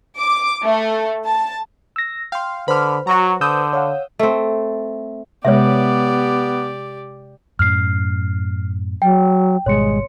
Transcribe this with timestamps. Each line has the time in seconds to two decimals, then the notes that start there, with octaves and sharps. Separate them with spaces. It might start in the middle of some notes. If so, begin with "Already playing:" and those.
0.18 D6
0.64 A3
1.27 A5
1.96 E6 A#6
2.32 F5 G5 C6
2.68 D3 B4 C5 B5 F6
3.07 F#3 F#4 A#5
3.41 D3 D#6 E6 G6
3.73 C#5 F5 F#5
4.19 A3 C4
5.45 C3 G#3 B3 G4 C#5 D5 E5
7.59 F#2 A2 C#4 F6 C7
9.02 F#3 G5
9.66 G#1 B2 G3 G#3 C#5 C6 C#7